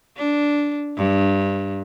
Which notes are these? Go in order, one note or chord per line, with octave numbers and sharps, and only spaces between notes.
D4
G2